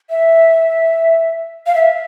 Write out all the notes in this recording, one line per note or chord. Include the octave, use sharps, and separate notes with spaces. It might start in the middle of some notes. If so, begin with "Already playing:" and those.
E5
F5
E5